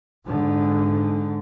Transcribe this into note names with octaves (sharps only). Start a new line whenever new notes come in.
G#2 D3